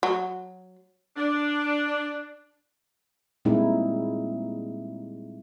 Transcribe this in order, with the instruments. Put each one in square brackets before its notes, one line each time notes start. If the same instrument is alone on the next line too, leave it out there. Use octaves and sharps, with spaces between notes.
[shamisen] F#3
[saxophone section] D4
[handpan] A#2 G3 G#3 C4 D#4 E4